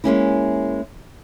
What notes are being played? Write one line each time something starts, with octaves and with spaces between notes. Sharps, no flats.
G#3 A#3 C#4 E4